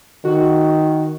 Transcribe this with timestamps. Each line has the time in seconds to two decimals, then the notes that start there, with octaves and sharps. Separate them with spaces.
0.24 D#3 F#4